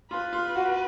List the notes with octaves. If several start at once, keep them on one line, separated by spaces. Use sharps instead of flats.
F4 B4
F4
F#4